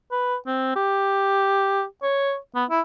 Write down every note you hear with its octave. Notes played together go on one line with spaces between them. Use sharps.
B4
C4
G4
C#5
B3
E4